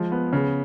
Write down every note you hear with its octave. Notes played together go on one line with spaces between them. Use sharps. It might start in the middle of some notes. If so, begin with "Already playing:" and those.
Already playing: F3 G#3
B3
C#3